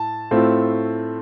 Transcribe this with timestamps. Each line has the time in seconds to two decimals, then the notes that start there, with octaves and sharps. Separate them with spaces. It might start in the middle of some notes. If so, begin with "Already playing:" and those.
Already playing: A2 A5
0.31 A2 A3 C4 F4